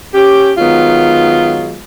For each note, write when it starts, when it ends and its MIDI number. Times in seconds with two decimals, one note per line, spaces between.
0.14 0.51 61
0.14 0.51 67
0.58 1.81 51
0.58 1.81 54
0.58 1.81 56
0.58 1.81 59
0.58 1.81 65